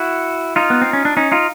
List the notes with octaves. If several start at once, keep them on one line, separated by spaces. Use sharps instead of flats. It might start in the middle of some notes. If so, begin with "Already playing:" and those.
Already playing: E4 F#4
D#4 F4
B3
C4
C#4
D4
C#4 D#4
D#4 F4